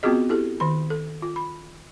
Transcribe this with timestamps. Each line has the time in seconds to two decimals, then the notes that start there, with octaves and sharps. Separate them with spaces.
0.03 B3 C4 F4 F#4 G#4 D#5
0.29 E4 G4 A4
0.60 D#3 B5
0.90 A4
1.22 F4
1.36 B5